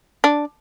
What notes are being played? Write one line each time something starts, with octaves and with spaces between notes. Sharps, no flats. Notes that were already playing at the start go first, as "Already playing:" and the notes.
D4